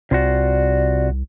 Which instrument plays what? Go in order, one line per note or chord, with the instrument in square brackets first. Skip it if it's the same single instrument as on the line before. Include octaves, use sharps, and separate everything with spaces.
[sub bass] C2 [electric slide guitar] C3 F4 F#4 [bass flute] D5